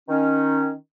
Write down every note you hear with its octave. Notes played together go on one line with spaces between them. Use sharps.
D#3 C#4